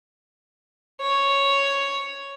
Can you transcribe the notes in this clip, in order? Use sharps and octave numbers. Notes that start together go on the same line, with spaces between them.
C#5